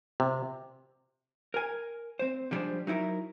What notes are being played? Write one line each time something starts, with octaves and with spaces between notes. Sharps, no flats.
C3
A#4 G#5
C4 C5
D3 F3 G3 G#3 D4 C5
F#3 D#4 E4 A#4